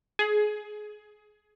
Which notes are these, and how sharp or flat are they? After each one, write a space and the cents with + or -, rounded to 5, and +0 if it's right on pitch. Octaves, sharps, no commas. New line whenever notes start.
G#4 +20